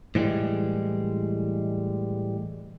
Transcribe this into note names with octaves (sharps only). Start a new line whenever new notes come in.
A2 E3 F3 G3 G#3